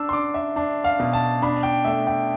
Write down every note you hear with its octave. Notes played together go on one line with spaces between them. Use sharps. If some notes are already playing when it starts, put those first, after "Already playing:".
Already playing: D4 E6
C6
D4 D6
E5
D4
F5
B2
A5
D4 B5
G5
A3 E5
G5